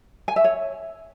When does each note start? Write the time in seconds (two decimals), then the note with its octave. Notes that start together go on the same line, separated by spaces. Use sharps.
0.28 G#5
0.36 E5
0.44 C#5